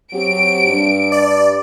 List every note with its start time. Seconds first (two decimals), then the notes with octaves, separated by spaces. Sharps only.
0.12 F#3 C4 G4 D7
0.65 G2
1.12 D5